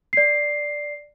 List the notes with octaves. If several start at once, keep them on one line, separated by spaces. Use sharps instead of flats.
D5 C7